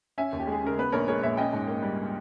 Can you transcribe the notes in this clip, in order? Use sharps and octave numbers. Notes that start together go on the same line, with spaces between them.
C#4 E5 G#5
D#2
G4
G#3 G#4
C#3 A#4
B3 B4
A#1 A#4 C#5
G#3 A#4 C#5
A#2 C#5 E5
C#4 D#5 G5
G#2
A#3
G3